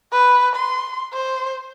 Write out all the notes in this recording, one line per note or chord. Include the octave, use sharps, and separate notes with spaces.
B4
C6
C5